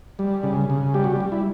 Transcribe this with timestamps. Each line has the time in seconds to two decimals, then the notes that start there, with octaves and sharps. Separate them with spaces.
0.19 G3
0.43 C#3
0.70 C#3
0.94 G3 G4
1.04 F#4
1.13 G4
1.20 G3
1.32 E4